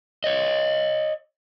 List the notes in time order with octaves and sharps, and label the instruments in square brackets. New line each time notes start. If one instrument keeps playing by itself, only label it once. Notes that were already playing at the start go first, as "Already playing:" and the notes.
[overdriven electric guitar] C#5 D#5